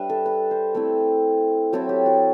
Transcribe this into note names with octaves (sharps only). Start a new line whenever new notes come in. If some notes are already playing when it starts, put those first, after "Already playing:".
Already playing: G3 D4 B4 E5
A4
B4
C5
A3 C4 E4 A4
F#3 C4 E4 A4
G4
F#4